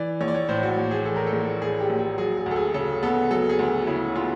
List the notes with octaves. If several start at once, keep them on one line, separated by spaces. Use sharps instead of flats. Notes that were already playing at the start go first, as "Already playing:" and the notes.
Already playing: E3 D5
A#1 C#5
D5
C#5
A2 C5
F#4
A#1
G#4
E3 A4
A#4
A4
A#1
A2 G#4
G4
A#1
G#4
F#3 G#4
G#4
D2 A4
G#4
C#3 A4
B3 A4
F#3 A4
G#4
D2
C#3 E4
B3 F4